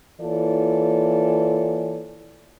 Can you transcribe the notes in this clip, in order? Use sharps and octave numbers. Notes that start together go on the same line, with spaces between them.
E3 A#3 F4 A4 C#5 D5